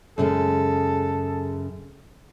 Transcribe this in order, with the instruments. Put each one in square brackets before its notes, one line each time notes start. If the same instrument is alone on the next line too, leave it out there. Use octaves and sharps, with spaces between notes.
[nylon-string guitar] F#2 C#3 G#3 [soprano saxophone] A4